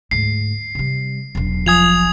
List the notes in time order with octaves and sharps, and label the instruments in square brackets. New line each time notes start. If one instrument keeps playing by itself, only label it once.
[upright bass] D2 G#2 [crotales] C7
[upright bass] C3 G3
E1 B1
[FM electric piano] F3 G#5 [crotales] D#6 G#6 F7